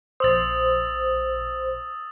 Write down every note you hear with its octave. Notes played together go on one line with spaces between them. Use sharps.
A#1 C5 D#6 E6 A6